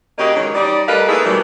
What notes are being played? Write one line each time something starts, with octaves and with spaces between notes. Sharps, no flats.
C#3 A#3 F#4 G4 D#5
D#3 E3 F#3 G#3 C#4
G3 D#4 D5
G3 A3 A#4 B4 D#5 F5
A3 A#3 D#4 E4 G#4 B4
B2 D#3 E3 F#3 G3 A3